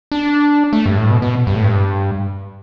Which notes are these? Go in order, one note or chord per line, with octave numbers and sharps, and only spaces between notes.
D4
A3
G2
A2
B2
B2
G2
A2
G2